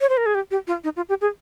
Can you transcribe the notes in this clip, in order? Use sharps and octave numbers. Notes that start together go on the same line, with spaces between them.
C#5
C5
A#4
G#4
G4
G4
F4
D#4
F4
G4
G#4